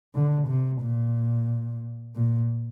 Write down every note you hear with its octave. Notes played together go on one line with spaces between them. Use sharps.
D3
C3
A#2
A#2